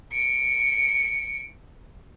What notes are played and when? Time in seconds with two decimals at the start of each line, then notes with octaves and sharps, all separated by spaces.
0.12 C#7 D7